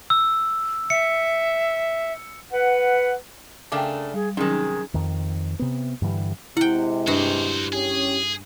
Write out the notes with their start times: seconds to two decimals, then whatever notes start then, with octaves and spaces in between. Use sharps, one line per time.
0.10 E6
0.90 E5 C#7
2.52 B4 F#5
3.72 C#3 A3 D4 A#4 G5 D6
4.14 G3 G#4
4.37 C3 D#3 F#3 C#4 D#4 G#4
4.94 F2 D#3
5.59 C3 B3
6.02 G2 D3 E3 G3
6.57 C3 G#3 E4 F#5 G5
7.07 G2 F#4 C5
7.73 C#4 G4 G#4